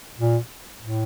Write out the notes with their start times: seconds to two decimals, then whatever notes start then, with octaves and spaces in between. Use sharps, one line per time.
0.19 A#2
0.81 A2